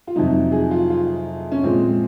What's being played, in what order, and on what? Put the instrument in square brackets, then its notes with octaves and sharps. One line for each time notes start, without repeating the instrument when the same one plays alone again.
[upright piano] F4
F2 C3 F#3 D#4
G#4
F4
F4
C#4
A#2 F3 G#3 C4